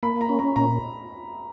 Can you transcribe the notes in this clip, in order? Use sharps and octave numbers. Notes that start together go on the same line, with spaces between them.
A#3 B5
A#5
C#4
A#5
A#2 A#5